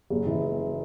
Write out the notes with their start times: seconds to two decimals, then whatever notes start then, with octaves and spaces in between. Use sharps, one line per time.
0.10 F#1
0.27 E3